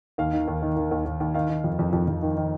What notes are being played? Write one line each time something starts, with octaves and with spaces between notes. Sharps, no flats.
D#2 F5
D#3
D#2
D#3
D#3
D#2
D#2
D#2
D#3 F5
D#3
F2
F2
F2
F2
D#3
D#3